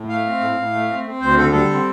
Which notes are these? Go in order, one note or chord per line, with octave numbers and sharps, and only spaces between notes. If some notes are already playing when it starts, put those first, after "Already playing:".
Already playing: A2
A3 F5
C4
A2
A2
A3
C4
C4
D2 C5
D3 A4
G3 A4
C4